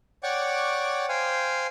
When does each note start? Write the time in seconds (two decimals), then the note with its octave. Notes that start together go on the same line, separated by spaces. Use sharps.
0.23 C#5 D5 F#5 G5 C#6 D6
1.09 C5 F5 G5 G#5